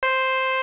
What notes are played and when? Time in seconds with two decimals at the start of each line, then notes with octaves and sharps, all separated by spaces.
0.03 C5